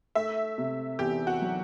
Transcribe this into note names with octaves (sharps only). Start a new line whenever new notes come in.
A3 E5
C3
E2 G4
F#4
F#3